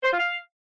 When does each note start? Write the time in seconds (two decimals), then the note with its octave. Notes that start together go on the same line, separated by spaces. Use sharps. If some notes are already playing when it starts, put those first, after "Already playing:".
0.03 C5
0.11 F4
0.19 F5